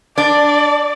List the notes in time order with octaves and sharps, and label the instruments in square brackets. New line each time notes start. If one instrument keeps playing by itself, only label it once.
[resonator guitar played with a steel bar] D4 [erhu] D5